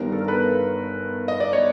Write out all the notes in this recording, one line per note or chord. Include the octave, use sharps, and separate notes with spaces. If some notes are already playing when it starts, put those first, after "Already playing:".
Already playing: G1 G2 D#3 G3 B3 A#4
A4
A#4
A4 B4
D#5
D5
C#5